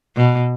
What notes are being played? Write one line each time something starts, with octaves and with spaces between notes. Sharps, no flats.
B2